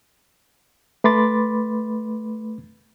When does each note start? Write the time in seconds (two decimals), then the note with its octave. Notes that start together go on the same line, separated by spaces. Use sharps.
1.04 A3 B4 B5 C6 D6 A6